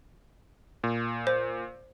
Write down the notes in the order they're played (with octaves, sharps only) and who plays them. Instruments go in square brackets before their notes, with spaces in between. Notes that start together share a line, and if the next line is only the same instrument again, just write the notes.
[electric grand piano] A#2
[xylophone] C5